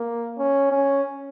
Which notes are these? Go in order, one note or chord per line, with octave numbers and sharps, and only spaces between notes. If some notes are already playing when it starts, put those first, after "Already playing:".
Already playing: A#3
C#4
C#4